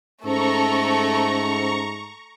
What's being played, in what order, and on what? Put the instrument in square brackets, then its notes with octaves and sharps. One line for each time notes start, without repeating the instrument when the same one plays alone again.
[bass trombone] G#2 [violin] A3 A4 [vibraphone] C#4 C5 A5 [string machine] A#5 C#6